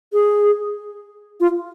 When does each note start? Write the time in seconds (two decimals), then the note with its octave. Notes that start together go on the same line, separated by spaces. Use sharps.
0.13 G#4
1.40 F4